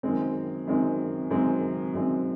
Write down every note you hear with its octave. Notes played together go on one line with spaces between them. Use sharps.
F#2 D#3 G#3 C4
F#2 D#3 G#3 C4
F#2 D#3 G#3 C4
F#2 D#3 G#3 C4